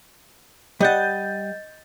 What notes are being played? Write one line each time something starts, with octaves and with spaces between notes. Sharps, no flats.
G3 D#5 F#5 G6 A6